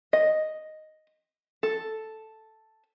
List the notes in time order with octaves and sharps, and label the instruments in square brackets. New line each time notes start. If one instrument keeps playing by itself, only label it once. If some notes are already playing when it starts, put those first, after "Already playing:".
[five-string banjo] D#5
A4